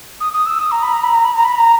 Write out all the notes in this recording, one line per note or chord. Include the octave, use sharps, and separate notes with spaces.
D#6
D#6
E6
D#6
A#5
B5
A#5
B5
A#5
B5
A#5
B5
A#5